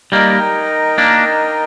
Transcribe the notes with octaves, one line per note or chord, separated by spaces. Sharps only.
G3 A#3 D#4 A#4 D#5 G5
A#3 D4